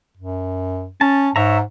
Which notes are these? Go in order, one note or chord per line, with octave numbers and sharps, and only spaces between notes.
F#2
C#4 A5
G#2 C#5 E5 A#5